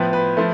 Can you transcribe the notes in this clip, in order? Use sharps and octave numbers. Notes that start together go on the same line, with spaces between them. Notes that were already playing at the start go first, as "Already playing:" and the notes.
Already playing: A2 F3 B3 B4
B4
F3 A3